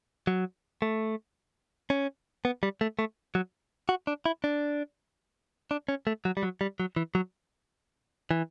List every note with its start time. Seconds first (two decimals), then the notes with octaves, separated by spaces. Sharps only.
0.27 F#3
0.82 A3
1.90 C#4
2.45 B3
2.63 G3
2.81 A3
2.99 A3
3.35 F#3
3.89 F#4
4.07 D4
4.26 E4
4.44 D4
5.71 D4
5.89 C#4
6.07 A3
6.25 F#3
6.37 G3
6.43 F#3
6.61 G3
6.80 F#3
6.96 E3
7.15 F#3
8.31 E3